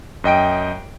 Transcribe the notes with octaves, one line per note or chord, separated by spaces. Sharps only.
F#2 D#5 G5 D7